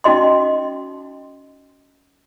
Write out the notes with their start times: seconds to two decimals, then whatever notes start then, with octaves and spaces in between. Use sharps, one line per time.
0.04 C#4 D#4 F#4 D#5 C6